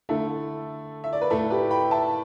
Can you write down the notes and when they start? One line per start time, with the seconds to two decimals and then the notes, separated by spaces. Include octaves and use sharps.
0.09 D3 A3 E4 A4
1.04 E5
1.13 D5
1.22 B4
1.30 A2 A3 E4 A4
1.50 G4 B4
1.71 G5 B5
1.91 E5 A5